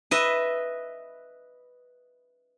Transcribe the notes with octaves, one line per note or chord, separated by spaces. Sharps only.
B4 D#5 E5